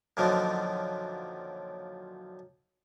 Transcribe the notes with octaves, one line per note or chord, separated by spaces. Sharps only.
F#2 A#2 D3 D#3 F3 F#3